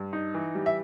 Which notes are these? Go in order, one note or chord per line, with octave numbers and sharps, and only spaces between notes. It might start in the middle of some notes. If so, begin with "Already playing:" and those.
Already playing: G2
D#4
E3
G3
E5